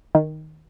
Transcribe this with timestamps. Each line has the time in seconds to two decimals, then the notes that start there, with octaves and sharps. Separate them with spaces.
0.15 D#3